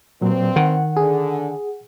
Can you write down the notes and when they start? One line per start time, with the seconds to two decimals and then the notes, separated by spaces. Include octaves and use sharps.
0.21 G2 A#2 F#3 C4
0.56 D#3 F#5
0.97 D3 G#4